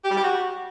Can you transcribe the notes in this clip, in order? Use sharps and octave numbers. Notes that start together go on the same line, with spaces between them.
G4
G3
G4
F#4